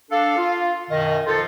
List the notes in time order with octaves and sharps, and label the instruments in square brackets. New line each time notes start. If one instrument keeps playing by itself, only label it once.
[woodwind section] D4 A4 [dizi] F5
[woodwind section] F4
[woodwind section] F#2 B2 D#3 [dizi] D#5
[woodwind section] F3 D#4 F4 [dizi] A4